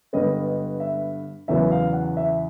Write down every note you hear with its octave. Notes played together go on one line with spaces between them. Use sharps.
G2 D3 G3 B3 D#5
D#5
E5
E2 C#3 F#3 B3 E5
F5
F#5
E5